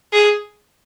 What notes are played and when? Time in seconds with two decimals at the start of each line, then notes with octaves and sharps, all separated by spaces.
0.13 G#4